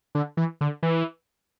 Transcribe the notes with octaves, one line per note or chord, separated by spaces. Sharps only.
D3
E3
D3
E3